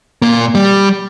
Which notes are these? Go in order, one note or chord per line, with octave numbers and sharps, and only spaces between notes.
A#2 A#3
G3